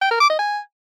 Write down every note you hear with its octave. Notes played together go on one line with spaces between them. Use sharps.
G5
A#4
D6
D#5
G#5